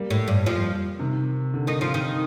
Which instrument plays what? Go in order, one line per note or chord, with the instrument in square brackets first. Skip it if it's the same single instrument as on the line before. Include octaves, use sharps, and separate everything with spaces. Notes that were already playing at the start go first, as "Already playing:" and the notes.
Already playing: [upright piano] G3 A#3
[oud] A2
G2
F2 F3
[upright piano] C3 D#3
D3
[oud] D#3 D#4
F3 F4
D#3 D#4